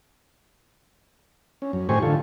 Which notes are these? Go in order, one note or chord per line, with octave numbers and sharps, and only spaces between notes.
C#4
F#2
A2 D#3 G4 C5 G#5 C#6
D3 F4 A4